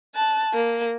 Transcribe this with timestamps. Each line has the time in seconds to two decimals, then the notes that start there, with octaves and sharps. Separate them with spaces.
0.15 A5 F#6
0.53 A#3